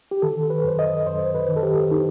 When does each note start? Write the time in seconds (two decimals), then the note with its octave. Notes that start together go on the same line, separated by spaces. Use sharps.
0.11 G4
0.22 D#3 A4
0.50 B4
0.64 F#2 C5
0.79 D#5
1.07 F#2 C5
1.35 B4
1.49 D#3
1.56 A4
1.63 G4
1.91 D#4